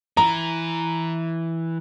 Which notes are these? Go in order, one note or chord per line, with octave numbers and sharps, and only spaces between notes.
E3 A#5